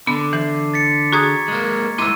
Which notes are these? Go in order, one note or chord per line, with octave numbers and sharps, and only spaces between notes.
D3 B3 D6
E3 C7
A6 B6 C#7
F#4 G#4 A#5 C#6 D#6 G#6
G#3 A#3
G#3 E4 C6 D6 E6 D#7